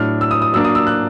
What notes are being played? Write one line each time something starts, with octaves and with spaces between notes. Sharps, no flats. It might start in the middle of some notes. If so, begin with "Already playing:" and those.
Already playing: A2 F#3 A3 D4 F6
E6
D#6
D#6
F#3 A#3 D4 E6
D#6
E6
F#6